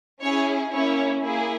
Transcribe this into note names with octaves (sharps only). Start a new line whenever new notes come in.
C#4 E4 G#4 C#5
A#3 C#4 E4 C#5
A#3 E4 G#4